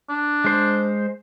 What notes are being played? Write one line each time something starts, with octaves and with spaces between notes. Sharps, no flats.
D4
G#3 C5